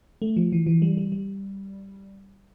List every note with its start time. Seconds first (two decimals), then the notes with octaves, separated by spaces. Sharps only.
0.22 A3
0.37 F3
0.52 E3
0.67 E3
0.82 G3
0.97 G3
1.12 G3